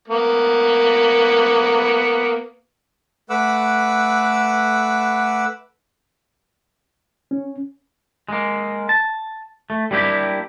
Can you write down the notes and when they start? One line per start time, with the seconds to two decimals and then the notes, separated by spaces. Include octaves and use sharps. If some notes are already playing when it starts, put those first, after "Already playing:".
0.08 A#3 B3
3.30 A3 B4 F#5 D6 E6
7.31 C#4
8.29 G#3 A#3
8.89 A5
9.70 A3
9.91 G3 A#3 D4 E4 G4